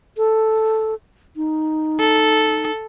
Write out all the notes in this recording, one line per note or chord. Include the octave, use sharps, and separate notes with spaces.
A4
D#4
A4